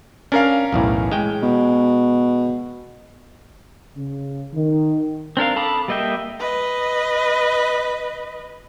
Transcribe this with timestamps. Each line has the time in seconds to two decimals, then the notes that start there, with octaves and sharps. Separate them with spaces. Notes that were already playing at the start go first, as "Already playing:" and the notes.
0.32 C#4 D4 A#4 F5
0.73 B1 E2 A2
1.12 G#3 G5
1.43 B2
3.97 C#3
4.54 D#3
5.37 C4 D4 A#4 F5
5.56 A4 A5 B5 D6 D#6
5.88 G3 A#3 D#5 E5 G5
6.40 B4 D#5